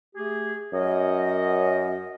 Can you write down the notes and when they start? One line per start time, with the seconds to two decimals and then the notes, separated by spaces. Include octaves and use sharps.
0.15 A3 G4 G#4
0.73 F#2 A#4 C#5 D#5